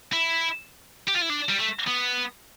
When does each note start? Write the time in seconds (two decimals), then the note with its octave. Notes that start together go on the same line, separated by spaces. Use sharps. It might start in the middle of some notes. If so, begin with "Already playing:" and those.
0.13 E4
1.08 G4
1.15 F4
1.22 E4
1.30 D4
1.49 G3
1.59 A3
1.88 B3